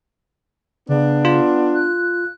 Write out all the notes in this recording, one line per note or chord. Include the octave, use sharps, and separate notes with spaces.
C#3 B3 D4
F4
F#6